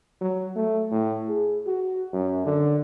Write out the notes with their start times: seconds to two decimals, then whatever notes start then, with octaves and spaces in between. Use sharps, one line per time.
0.21 F#3
0.56 A3
0.91 A2
1.29 G#4
1.67 F#4
2.13 F#2
2.45 D3